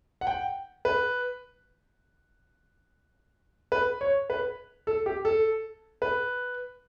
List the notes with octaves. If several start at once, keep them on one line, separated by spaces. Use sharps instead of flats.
F#5
G5
B4
B4
C#5
B4
A4
G4
A4
B4